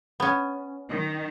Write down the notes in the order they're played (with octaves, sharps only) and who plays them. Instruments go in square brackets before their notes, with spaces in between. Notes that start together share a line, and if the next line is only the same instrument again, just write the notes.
[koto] B3 C#4
[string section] D#3